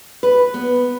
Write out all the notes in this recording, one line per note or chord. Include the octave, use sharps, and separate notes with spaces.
B4
B3